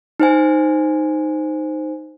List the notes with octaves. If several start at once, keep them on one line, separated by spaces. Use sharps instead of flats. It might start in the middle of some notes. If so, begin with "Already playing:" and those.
D#4 C5 G#5